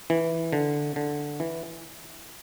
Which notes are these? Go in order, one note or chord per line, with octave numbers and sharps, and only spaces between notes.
E3
D3
D3
E3